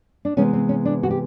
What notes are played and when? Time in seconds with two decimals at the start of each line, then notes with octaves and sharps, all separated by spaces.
0.25 D4
0.37 C3 E3 G#3 B3 C#4
0.53 C4
0.69 C#4
0.85 D4
1.03 F#4
1.10 G4